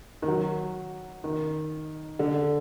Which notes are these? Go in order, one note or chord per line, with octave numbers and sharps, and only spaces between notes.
D#3
F#3
D#3
D3